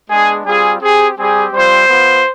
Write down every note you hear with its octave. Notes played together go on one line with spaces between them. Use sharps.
G#3 B3 D4 G#4
G3 C4 F4 G#4
C4 G4 G#4
G3 C4 G4 G#4
G3 C4 F4 C5
B3 F4